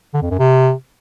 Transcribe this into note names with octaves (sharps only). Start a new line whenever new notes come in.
D3
F2
F#2
C3